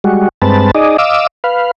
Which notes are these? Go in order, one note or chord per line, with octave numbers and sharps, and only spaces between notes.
G3 G#3 F#4
G2 G#3 C4 B4 A5
D#4 G#4 D5 D#5
D#5 F5 D6 E6
B4 F5